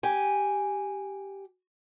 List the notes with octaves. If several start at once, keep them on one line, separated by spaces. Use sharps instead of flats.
G4 G#5